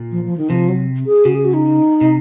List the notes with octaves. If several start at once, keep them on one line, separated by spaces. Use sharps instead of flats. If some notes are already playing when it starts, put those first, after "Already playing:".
Already playing: A#2
F3
F3
D#3
C3 F3
F#3
G#4
C#3 F#4
G#4
F#4
D#4
C3